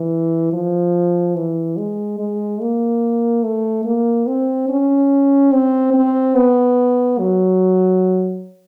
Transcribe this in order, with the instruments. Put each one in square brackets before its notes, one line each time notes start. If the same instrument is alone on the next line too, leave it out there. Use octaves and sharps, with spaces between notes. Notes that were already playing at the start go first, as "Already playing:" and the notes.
Already playing: [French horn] E3
F3
E3
G#3
G#3
A#3
A3
A#3
C4
C#4
C4
C4
B3
F#3